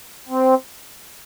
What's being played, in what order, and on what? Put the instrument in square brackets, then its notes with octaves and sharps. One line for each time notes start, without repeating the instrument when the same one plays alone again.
[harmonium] C4